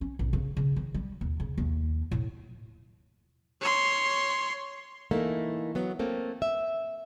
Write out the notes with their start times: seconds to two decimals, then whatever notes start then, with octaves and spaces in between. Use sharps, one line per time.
0.01 C#4
0.19 A1
0.33 C#3
0.57 C#3
0.76 D#3
0.94 G3
1.21 D#2
1.40 C#3
1.58 D#2
2.11 A2
3.61 C#5 C6
5.11 E3 A3 A#3 D#4
5.75 F#3 B3
5.99 A3 A#3 C4
6.42 E5